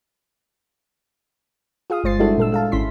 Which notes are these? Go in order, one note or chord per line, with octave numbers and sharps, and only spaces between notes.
F4 G#4 F5 D#6
G1 G#3 C5 A6 C7
G3 G#3 D4 E4 F#4 A4
A#2 A4 E6
G#3 F5 A5
G#1 C#4 E4 C6 B6